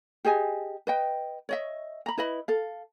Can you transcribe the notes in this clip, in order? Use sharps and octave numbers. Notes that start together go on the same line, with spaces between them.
G4 G#4 D#5 G#5
B4 D#5 G5
C#5 D#5 E5
A#5 B5
E4 B4 D#5 B5
A4 F5